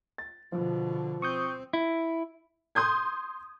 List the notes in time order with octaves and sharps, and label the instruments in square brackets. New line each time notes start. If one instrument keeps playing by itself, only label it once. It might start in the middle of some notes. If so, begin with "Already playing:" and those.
[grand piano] A6
[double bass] B2 D3 [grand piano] F3
[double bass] C4 [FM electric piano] C#6 D#6 G6
[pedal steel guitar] E4
[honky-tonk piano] C6 D#6 G6 G#6